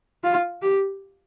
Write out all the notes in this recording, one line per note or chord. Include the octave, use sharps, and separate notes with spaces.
F4
G4